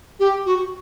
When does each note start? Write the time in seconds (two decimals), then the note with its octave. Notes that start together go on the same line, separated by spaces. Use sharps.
0.19 G4
0.45 F#4